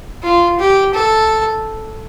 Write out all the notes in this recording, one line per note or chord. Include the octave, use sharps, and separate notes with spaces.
F4
G4
A4